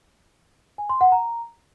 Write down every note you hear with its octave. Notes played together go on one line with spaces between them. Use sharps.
G#5
C6
F#5
A#5